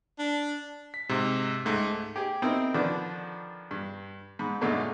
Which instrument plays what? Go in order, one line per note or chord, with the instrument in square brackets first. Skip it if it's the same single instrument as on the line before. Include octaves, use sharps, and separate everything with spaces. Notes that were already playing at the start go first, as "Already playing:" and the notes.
[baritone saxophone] D4
[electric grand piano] B6
G#2 C3
C#2 G#2 A3
[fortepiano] G4 G#4
C4 D#4 E4 A#4 C5
D3 D#3 F3 D4 B4
G2
G#2 B5
F#2 A#2 D3 G#3 A3 D#4